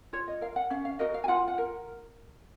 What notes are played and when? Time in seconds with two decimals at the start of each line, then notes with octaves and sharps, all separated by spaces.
0.13 F4 C#5
0.28 D#5
0.41 A#4 F5
0.56 F#5
0.70 C#4 F5
0.85 F5
0.99 F#4 A#4 D#5
1.14 F5
1.24 G#5
1.28 F4 F#5
1.48 F#5
1.58 A#4